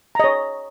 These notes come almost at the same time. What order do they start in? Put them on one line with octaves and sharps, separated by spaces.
A#5 D#5 C#5